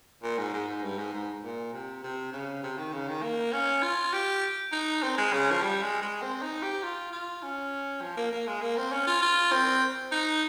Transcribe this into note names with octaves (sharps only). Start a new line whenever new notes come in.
A#2
G#2
G#2
G#2
G2
G#2
G#2
A#2
C3
C3
C#3
C3
D#3
C#3
D#3
A#3
C#4
F4
G4
D#4
C4
G#3
C#3
F3
G3
G#3
G#3
C4
D#4
G4
F4
F4
C#4
F3
A#3
A#3
G#3
A#3
C4
C#4
F4
F4
C4
D#4